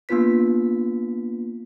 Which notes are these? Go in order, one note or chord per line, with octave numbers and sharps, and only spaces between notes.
A#3 B3 D4 F4 B4 B6